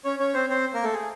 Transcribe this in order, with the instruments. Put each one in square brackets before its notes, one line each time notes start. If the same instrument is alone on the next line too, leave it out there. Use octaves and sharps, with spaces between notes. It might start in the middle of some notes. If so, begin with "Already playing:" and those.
[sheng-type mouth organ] C#4 C#5
C#4 C#5
C4 C5
C4 C5
A#3 A#4
A3 A4
G#4